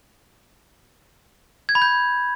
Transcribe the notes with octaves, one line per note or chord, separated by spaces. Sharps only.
G#6
B5
G6